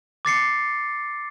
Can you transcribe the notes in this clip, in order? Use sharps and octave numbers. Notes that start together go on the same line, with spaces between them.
D6 A6 C7 C#7